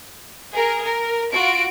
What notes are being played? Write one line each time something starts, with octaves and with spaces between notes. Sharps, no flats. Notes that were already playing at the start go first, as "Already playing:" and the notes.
G#4 A#4
A#4
F4 F#4 D7